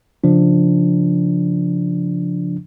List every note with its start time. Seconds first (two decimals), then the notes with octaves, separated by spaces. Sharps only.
0.24 C#3 F3 D4